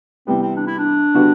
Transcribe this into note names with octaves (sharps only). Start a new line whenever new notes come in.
C3 E3 G3 B3 C4
C4
D4
E4
D4
D3 G3 B3 F#4